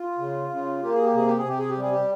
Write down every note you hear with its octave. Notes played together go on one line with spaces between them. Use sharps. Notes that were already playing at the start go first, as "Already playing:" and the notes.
Already playing: F4
C#3
C#3
A#3 G4
G#4
G4
C3 G#4
G4
G#4
C3 G4
G#4
G4
G3 G#4
G4